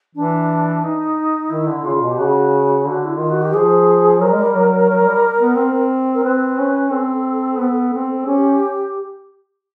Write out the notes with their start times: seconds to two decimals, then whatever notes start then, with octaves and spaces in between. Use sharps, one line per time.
0.15 E3 D4
0.84 D#4
1.50 D#3 E4
1.68 D3
1.85 C#3 F4
2.01 B2
2.09 G4
2.18 C#3 F#4
2.85 D3 F#4
3.05 E4
3.17 D#3 F4
3.30 F#4
3.42 G4
3.53 F3 G#4
4.21 F#3 A#4
4.33 G#3
4.44 G3
4.55 F#3
4.89 F#3
5.01 F#3
5.05 G3
5.40 B3
5.56 C4
6.14 A#4
6.23 C4 B4
6.58 C#4
6.91 C4 A4
7.59 B3
7.93 C4
8.26 C#4 G4